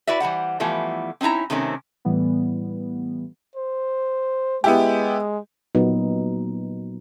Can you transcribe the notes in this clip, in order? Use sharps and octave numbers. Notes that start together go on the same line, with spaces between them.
E4 F#4 B4 D5 E5
E3 G3 C5 F#5
E3 F3 G3 A3 B3 E4
C4 C#4 D#4 E4 A#5
C3 D#3 A3 C4 C#4
A2 E3 G3 B3
C5
G#3 B3 E4 G4
A#2 F#3 B3 D#4